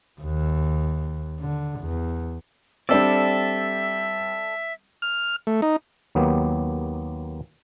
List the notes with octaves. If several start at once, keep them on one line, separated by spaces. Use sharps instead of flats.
D#2
D3
E2
G3 C4 D4 A4 D5 E5 E6
F6
A3
D#4
D#2 F#3 A#3 B3 G4